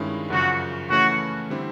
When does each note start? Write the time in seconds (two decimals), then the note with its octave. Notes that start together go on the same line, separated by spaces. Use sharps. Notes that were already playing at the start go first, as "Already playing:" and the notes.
Already playing: G2 D#3 G#3 C#4 E4
0.30 F#2 C#3 F3 F#4
0.90 C#3 E3 A3 C#4 E4 F#4
1.50 D3 G3 C4 E4